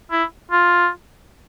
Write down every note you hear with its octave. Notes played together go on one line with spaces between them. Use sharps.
E4
F4